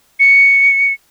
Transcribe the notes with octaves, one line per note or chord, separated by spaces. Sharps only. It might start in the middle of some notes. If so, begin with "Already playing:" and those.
C#7